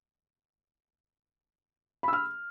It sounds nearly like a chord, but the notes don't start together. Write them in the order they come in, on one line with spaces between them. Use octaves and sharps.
B5 E6 F6